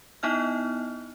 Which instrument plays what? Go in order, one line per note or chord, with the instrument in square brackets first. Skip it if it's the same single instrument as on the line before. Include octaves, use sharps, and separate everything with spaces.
[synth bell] B3 D#4 E4 D#5 F6